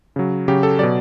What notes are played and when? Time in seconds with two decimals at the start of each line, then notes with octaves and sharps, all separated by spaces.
0.16 C#3 F#3
0.48 C#3 F#3 G4
0.63 A4
0.79 B2 F#3 D5